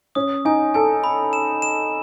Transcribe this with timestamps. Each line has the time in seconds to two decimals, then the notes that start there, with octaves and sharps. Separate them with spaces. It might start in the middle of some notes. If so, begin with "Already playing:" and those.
0.15 C#4 D#6
0.45 D#4 G#5
0.74 A4 G#5
1.04 B5
1.33 E7
1.62 E7